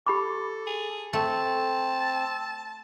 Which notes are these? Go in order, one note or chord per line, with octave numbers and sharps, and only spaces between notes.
G4 A4 B5 D6
G#4
A3 C4 A5